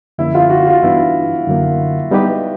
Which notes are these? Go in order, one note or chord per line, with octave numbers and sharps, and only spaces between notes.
F#2 D3 F3 A#3 C#4 E4
F4
F#4
F4
G2 E3 G3 B3 D4 E4
F#2 D3 F#3 A#3
G3 B3 D#4 G4 B4